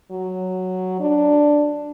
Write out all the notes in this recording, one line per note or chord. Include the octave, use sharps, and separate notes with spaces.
F#3
D4